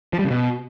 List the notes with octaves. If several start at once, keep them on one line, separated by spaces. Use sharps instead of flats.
F3
G3
C#3
B2